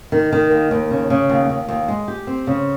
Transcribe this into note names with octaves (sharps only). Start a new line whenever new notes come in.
D#3
D#3
D#2
D#2
C#3
C#3
D#2
D#2
D#2
G#3
G4
C4
C#3